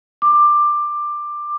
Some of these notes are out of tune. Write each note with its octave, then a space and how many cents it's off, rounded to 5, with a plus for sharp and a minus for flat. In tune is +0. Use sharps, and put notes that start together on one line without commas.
D6 +15